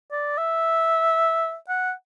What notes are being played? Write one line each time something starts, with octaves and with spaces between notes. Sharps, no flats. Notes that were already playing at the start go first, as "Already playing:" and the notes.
D5
E5
F#5